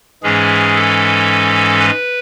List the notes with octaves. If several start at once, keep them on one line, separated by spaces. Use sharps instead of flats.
G#2 E3 G#3 C#4 G#4
A4
B4